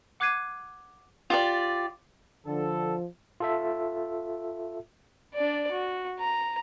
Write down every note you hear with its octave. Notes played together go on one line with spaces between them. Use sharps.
F#5 D6 F#6 G#6 C7 D#7
F4 G4 D5
D3 F3 A4
F4 A4 E5
D4 D5
F#4
A#5